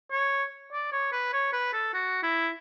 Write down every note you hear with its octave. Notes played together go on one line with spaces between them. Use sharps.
C#5
D5
C#5
B4
C#5
B4
A4
F#4
E4